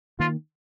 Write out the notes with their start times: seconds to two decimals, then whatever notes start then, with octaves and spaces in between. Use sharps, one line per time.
0.20 D#3 A#3 F4